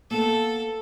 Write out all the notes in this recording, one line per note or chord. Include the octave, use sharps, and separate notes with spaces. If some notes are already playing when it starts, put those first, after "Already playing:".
A#3 B3 A4 F5